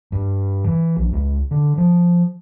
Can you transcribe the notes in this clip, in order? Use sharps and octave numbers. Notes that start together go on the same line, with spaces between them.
G2
E3
A#1
C#2
D3
F3